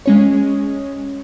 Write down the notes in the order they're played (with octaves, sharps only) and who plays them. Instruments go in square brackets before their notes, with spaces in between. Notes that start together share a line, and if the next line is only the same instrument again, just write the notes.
[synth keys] G#3 C#4 C#5